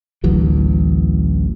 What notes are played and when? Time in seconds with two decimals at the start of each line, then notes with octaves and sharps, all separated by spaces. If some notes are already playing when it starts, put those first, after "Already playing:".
0.24 A1 D2 E3 F#3